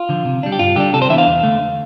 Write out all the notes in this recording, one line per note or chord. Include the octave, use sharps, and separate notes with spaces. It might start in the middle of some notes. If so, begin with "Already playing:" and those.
Already playing: F4
D3 F3
C3
G3 D4
G4
G2 F4
D3 G3 D4 G4
C3 A4
C5
E3 B3 D4 E5
F5
E2
D3 A3